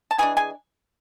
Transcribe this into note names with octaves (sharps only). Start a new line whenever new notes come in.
A5
E3 G#3 D4 G#4 G#5
G#4 G#5